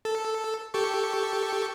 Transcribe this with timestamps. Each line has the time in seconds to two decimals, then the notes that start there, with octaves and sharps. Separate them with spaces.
0.05 A4
0.74 G4 A4 C#6